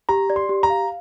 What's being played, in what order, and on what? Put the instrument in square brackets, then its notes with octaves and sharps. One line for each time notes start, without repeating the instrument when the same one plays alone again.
[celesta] G4 [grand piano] A#5
[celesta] D5
[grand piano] C6
[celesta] G4
[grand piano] A#5
[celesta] F5